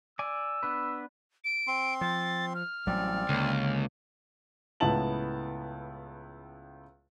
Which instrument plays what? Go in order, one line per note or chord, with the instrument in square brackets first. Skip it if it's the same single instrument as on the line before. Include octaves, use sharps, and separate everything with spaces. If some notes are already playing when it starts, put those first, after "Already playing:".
[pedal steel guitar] D5 G#5 [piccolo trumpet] E6
[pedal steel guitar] B3 D4 B4
[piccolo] D7
[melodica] C4 C6
[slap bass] F3 [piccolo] A6
[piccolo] F6
[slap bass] A1 F#3 G3 [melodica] C4 D5
[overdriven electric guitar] C#2 [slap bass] D3 A#3
[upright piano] C#2 A2 B3 E4 A5 F#7